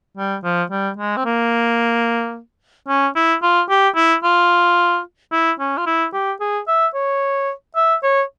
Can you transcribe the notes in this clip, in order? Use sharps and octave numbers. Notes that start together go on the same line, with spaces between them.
G3
F3
G3
G#3
C4
A#3
C#4
E4
F4
G4
E4
F4
E4
C#4
F4
E4
G4
G#4
E5
C#5
E5
C#5